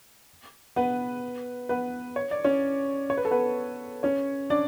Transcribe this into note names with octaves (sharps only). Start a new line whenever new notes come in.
B3 B4
B3 B4
C#5
D5
C#4 C#5
C#5
B4
A4
B3 B4
C#4 C#5
D4 D5